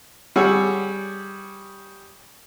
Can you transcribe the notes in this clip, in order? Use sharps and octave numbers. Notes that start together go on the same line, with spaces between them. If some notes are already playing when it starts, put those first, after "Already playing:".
G3 G#4 C#5 F#5 E6